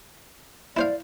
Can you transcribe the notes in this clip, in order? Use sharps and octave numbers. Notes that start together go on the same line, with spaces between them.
E4 C5 D5 F5